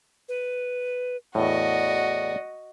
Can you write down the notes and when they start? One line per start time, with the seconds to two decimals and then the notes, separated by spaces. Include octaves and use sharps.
0.29 B4
1.35 E2 A2 F#4 D5 D#5